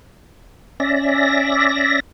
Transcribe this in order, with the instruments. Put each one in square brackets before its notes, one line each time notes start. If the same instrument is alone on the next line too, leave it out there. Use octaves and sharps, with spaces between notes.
[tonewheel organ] C#4 D5 E5 A#6